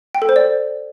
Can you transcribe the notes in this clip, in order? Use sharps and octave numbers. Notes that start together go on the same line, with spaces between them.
G5
A4
C5
D5